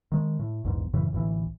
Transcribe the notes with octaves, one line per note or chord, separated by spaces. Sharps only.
D#3 G#3
A2
A#1 E2 G#2
F#2 A2 C#3 E3
A1 D2 A2 E3